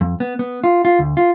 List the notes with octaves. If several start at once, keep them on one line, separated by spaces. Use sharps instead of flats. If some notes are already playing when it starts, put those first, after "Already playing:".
F2
B3
B3
F4
F4
D2
F4